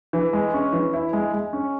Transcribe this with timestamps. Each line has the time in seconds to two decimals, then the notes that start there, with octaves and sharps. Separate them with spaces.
0.13 E3
0.33 G#3
0.54 C#4
0.73 E3
0.94 E4
1.13 G#3
1.33 G#3
1.53 C#4